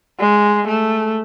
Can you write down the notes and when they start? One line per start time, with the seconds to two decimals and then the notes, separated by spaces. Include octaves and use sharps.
0.20 G#3
0.68 A3